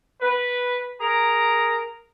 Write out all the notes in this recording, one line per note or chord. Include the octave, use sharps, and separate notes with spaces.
B4
G#4 A#4 A#5